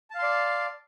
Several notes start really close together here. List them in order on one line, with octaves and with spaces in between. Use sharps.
A5 F5 C6 D5